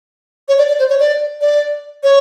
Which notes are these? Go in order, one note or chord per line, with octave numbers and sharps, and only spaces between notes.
C#5
D5
D5
C5
C#5
D5
D5
C#5